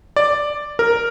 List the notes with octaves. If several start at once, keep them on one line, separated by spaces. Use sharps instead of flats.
D5
A#4